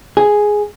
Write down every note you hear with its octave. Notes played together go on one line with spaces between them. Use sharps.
G#4